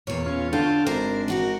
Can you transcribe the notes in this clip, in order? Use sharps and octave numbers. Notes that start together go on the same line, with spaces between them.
E2 A#2 C#5
C#4 F4
D3 F4 F5 G5 A5
G#1 D4 A#4 C5
D#4 F#4 A#4